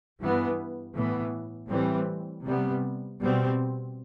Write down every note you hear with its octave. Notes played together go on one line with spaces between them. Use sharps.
G2 E3 B3
A2 E3 B3
A2 E3 G3 C4
C3 G3 B3
B2 G3 C4